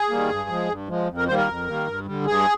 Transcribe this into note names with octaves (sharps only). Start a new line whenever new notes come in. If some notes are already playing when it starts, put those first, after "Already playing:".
Already playing: G#4
D#3 G3 A#3
G2
F3 G#3
G2
F3 G#3
F2
A#4
D#3 G3 A#3 C5
A#4
F2
D#3 G3 A#3
G2
D3 G3
G2 G#4